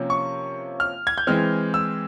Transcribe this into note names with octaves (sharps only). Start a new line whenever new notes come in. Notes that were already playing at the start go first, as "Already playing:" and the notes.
Already playing: C3 F3 A#3 C#4
C#6
F6
G#6
G6
E3 G#3 C4 F6
E6